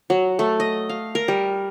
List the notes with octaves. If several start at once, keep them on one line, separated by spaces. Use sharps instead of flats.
F#3
A3
D#5
F5
A#4
G3